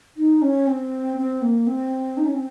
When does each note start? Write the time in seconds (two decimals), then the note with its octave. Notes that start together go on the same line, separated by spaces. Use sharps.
0.17 D#4
0.42 C#4
0.67 C4
1.17 C4
1.42 A#3
1.67 C4
2.17 D#4
2.26 C#4
2.34 C4